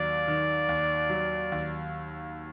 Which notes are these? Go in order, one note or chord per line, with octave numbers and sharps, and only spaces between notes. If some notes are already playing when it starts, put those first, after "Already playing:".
Already playing: D#2 F#3 D5
D#3
D#2
F#3
D#2